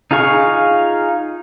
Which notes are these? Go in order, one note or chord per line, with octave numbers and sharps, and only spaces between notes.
D#4 F4 G#4 F5 C#6